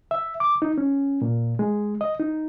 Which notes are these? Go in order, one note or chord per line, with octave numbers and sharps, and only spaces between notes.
E5
D6
D#4
C#4
A#2
G#3
D#5
D#4